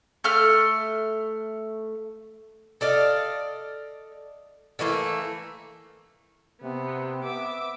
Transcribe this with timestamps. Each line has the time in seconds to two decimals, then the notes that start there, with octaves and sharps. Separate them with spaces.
0.24 A3 F6
2.81 A4 D5 D#5 F5
4.79 D3 E3 A3 A#3
6.62 C3 B3
7.24 B3 E5 D6